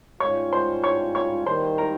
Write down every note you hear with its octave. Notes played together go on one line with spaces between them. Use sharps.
G#2 G3 C#4 F4 C#5 C#6
C5 C6
C#5 C#6
C#5 C#6
D#2 D#3 G3 C5 C6
A#4 A#5